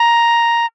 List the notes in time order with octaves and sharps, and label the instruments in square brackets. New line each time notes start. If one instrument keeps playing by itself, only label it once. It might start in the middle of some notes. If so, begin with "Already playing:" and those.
Already playing: [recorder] A#5